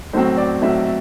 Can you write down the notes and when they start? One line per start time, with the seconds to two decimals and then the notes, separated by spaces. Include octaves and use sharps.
0.13 B1 A2 F#3 C4 C5
0.37 D5
0.61 B1 A2 F#3 C4 E5
0.85 E5